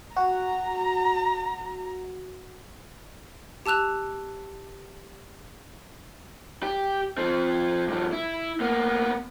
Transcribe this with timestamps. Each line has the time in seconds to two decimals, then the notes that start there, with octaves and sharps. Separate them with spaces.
0.17 F#4 A#5
3.66 G4 A5 E6 F#6 F7
6.63 G4
7.18 F3 C4
7.88 G2 F3
8.13 E4
8.60 A#3 B3